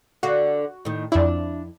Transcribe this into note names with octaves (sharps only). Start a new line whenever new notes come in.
D3 F#4 F5
A2 D#3
F2 D4 E4